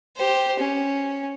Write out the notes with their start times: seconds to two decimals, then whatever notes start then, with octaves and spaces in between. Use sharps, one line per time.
0.16 G4 C5
0.59 C#4